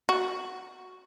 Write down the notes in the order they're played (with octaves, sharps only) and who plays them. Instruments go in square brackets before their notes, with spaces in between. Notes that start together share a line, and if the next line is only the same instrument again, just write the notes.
[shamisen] F#4